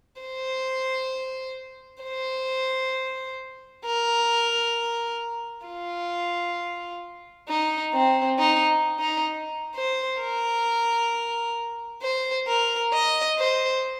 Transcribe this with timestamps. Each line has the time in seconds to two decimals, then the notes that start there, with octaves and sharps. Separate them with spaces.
0.22 C5
2.03 C5
3.85 A#4
5.67 F4
7.49 D#4
7.94 C4
8.39 D#4
9.00 D#4
9.75 C5
10.20 A#4
12.02 C5
12.47 A#4
12.93 D#5
13.38 C5